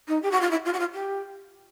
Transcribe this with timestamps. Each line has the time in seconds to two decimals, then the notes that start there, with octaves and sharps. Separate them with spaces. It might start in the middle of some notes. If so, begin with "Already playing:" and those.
0.08 D#4
0.22 G4
0.31 F#4
0.41 F4
0.51 E4
0.65 F4
0.73 F#4
0.79 F4
0.93 G4